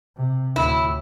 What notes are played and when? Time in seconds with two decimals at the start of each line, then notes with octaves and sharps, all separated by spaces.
0.17 C3
0.56 D2 A2 E4